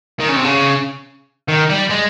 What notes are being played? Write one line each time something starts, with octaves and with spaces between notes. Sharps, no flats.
D#3
C#3
C3
C#3
D#3
G3
G#3